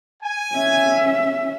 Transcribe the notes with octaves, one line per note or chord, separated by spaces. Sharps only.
G#5
C#4 E5